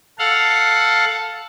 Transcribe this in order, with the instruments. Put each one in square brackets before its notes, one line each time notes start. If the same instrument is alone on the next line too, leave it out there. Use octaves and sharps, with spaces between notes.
[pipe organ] A4 F5 F#5